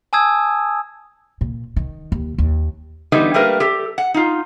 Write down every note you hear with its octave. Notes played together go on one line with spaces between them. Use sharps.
G#5 A5 D#6 E6 G#6
A#2
D#3
D#2
D#2
D3 E3 G3 A3 B3 D#4
G3 A3 A#3 G4 A#4 B4
G4 A4
F#5
D#4 F4